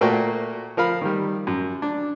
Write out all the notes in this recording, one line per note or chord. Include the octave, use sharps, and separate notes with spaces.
A#2 A3 A#3 F#4 G5
F3 A#4 F5 B5
D#3 G3
F#2
D4